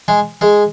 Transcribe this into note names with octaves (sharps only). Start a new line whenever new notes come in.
G#3 G#4
G#3 G#4